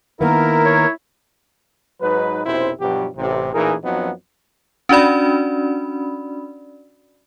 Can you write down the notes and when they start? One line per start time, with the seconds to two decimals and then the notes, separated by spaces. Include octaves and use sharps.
0.21 D#3 A#3 B3 E4 A#4
0.65 C#5
2.01 G#2 F#3 D#4 B4
2.45 B1 F#2 C3 E4 C5
2.81 G2 B2 F3 F#3 G4
3.17 A1 C3
3.53 A1 A#2 E3 D#4 G#4 A#4
3.84 F#2 F3 F#3 B3 C4 D#4
4.89 C#4 D4 F#4 D5 B5